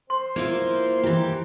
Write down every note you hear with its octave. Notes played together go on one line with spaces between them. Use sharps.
C5 C6
A#3 E4 F4
E3 E4 G4 A#5